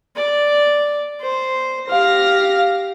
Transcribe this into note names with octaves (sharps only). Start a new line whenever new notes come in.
D5
C5
G4 F5 A#6